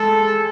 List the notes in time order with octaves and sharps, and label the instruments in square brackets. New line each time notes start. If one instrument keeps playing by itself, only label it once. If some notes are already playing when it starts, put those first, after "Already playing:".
Already playing: [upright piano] G#3 [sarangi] A4